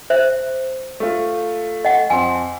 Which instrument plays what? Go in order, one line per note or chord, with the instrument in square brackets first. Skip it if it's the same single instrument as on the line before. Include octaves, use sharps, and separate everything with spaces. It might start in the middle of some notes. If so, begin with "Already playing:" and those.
[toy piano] C5 E5
[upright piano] A3 F4
[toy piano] D#5 F#5
[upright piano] F2 C6 [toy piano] G#5